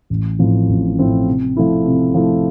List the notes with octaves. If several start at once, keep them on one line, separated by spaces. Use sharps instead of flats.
A1
A2 F3 C4 E4
A1
A2 F3 C4 E4
C3
F3 A3 E4
C3
F3 A3 E4